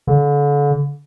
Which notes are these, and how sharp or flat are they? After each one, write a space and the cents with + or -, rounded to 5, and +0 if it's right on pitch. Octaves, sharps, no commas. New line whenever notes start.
D3 -35